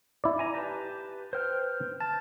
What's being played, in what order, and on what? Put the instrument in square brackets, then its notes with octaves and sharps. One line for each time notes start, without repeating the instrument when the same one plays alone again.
[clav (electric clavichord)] E4 D5
[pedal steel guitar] G#5 A#5
G4 B4 A5
[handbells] B4 F6 [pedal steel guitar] C5 G5
[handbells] A5 F6 A6